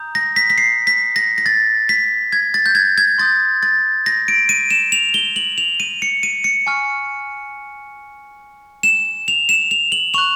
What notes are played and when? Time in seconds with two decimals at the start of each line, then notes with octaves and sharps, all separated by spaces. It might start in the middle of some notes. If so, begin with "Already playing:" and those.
Already playing: A#5 D#6 G6
0.15 A#6
0.36 B6
0.50 B6
0.58 C7
0.87 B6
1.16 A#6
1.38 A#6
1.46 A6
1.89 B6
2.32 G#6
2.54 A6
2.66 G6
2.75 G#6
2.98 G#6
3.18 C6 D#6 G6 A6
3.63 A6
4.06 A#6
4.28 D7
4.49 D#7
4.71 E7
4.92 F7
5.14 G7
5.36 F#7
5.58 F7
5.80 D#7
6.02 C#7
6.23 D#7
6.44 C#7
6.67 G#5 C#6 F6
8.83 E7
9.28 F7
9.49 E7
9.71 F7
9.92 F#7
10.14 C#6 F#6 F7